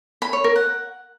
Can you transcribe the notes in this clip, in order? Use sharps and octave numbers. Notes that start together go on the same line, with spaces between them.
B5
C#5
A#4
F#5